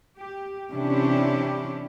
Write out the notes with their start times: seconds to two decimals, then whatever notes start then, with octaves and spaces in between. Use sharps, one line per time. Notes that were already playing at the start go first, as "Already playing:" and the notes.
0.18 G4
0.71 C3 E3 C#4 D4 E4 G4